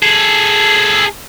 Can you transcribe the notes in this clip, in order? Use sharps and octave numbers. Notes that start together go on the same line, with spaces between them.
G#4 A4